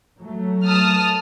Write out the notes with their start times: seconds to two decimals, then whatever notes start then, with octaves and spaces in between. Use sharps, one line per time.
0.18 F#3 A3
0.65 A5 D#6 F6